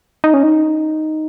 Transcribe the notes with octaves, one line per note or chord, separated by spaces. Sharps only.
D#4
C#4
D#4